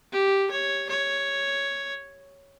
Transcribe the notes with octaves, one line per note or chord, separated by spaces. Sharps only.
G4
C#5
C#5